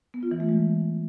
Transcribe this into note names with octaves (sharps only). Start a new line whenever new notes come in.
B3
F4
E3
A3
G#3